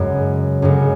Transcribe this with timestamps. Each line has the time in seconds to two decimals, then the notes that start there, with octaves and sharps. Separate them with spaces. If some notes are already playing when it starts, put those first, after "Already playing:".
Already playing: F#2 C#3 G#3
0.62 F#2 C#3 G#3